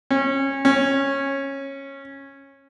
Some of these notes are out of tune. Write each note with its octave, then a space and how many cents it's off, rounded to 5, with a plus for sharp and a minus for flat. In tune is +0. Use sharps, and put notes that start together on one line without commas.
C#4 -25
C#4 -15